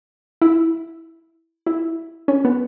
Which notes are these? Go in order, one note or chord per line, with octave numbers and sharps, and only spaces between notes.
E4
E4
C#4
B3